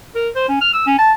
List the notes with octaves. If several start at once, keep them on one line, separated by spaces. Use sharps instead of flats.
A#4
C5
C#4
F6
E6
C#4
A5